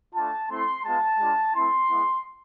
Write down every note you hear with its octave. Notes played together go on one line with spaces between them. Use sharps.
A3 D4 F4 A5
A3 C4 E4 C6
G#3 B3 F4 A5
G#3 D4 F4
A3 C4 E4 C6
G#3 B3 E4